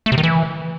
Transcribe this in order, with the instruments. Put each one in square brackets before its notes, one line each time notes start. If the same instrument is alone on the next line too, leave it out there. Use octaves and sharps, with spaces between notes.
[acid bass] A3
C3
D#3
E3